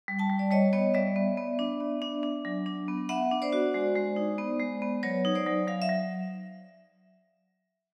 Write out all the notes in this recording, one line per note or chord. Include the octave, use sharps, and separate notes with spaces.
G3
G5 A5
G3
D5
G3 C#5 D#5
B3 C#5 D#5
G3 D5 E5
B3
B3
D4
B3
D4
D4
F#3
D4
B3
B3 E5 F#5
D4
C5 D5
F#4
G#3
G#3
D#4
B3
G#3
B3
F#3 B4 C#5
D#4
C5 D5
F#3
F#3 F5
E5
F#3